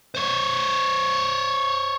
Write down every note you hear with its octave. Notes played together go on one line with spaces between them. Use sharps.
C5 C#5